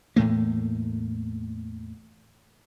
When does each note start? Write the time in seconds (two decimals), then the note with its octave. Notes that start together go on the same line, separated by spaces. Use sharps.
0.16 E2 A2 A3 A#3